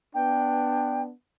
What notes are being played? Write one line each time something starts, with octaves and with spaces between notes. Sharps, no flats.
B3 D4 G5